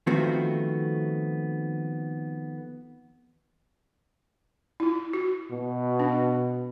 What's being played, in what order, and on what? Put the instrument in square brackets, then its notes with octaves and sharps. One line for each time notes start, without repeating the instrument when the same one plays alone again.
[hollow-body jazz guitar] D#3 F3 A3 B3 C4 F#4
[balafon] E4 F4
F#4
[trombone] B2
[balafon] D4